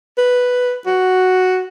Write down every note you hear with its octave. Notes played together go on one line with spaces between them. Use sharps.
B4
F#4